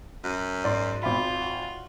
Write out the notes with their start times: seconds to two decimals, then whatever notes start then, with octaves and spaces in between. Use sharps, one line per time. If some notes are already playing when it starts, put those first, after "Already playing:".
0.24 F#2
0.65 G#2 D5 C6
1.03 G#1 F4 E5 G5 B5 D6
1.41 F#4